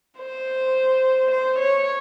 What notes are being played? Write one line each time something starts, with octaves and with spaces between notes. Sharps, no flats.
C5
C5
C#5